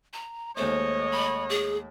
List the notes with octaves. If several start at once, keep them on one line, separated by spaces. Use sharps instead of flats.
A#5
D#2 G#3 A3 C5 C#5 D#5
B5
G#4